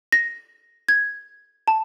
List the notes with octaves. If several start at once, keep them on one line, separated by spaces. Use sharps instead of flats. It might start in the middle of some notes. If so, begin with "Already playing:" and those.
A#6
G#6
A5